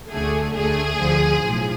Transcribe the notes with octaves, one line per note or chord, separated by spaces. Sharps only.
D2 D3 A3 G#4
D2 D3 A3 G#4
D2 D3 F3
B1 A2 F3